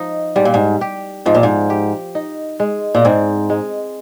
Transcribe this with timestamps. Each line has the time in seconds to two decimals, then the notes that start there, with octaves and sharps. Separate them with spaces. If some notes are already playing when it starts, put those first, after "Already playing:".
Already playing: F3 D#4
0.36 G#2 G3
0.45 A#2
0.54 G#2
0.81 G4
1.26 G#2 F3
1.35 A#2
1.43 G#2
1.70 G4
2.15 D#4
2.60 G#3
2.95 A#2
3.05 G#2 C4
3.50 G#3